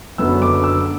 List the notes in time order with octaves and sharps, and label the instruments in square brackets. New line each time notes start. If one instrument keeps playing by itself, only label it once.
[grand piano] F#1 F#2 D3 F#3 B3 E6
D6
E6